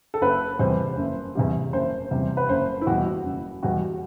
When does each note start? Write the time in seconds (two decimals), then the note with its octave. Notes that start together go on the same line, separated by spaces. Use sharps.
0.14 A4
0.21 F#1 B4
0.59 E2 C3 G3 C5
0.97 F#1
1.35 E2 C3 G3
1.73 F#1 C5
2.11 E2 C3 G3
2.37 B4
2.49 F#1 C5
2.81 E4
2.86 E2 B2 G3 F#4
3.25 F#1
3.63 E2 B2 G3 F#4